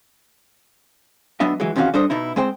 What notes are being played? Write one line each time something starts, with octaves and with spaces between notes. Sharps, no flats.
F#3 B3 D4 D#5 E5
E3 F#3 G#3
E2 C3 D#3 C#4 F#4 F5
G3 D4 A4 C5 D#5
B2 D#4 E4
G#3 C4 C5 G5